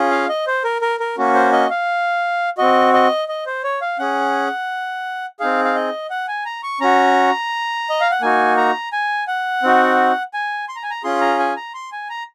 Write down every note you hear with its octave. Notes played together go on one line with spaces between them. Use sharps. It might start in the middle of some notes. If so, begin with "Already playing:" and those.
Already playing: C#4 F4 G#4
F5
D#5
C5
A#4
A#4
A#4
A#3 C#4 F#4
C5
D#5
F5
C4 F#4 D#5
D#5
D#5
C5
C#5
F5
C#4 G#4 F#5
C4 D#4 G#4 F5
F5
D#5
F#5
G#5
A#5
C#6
C#4 F#4 A#5
D#5
F5
F#5
A#3 D#4 F#4 G#5
A#5
G#5
F#5
C4 D#4 F#4
G#5
C6
A#5
G#5
A#5
C#4 F4 G#4 C6
A#5
G#5
A#5
C6
G#5
A#5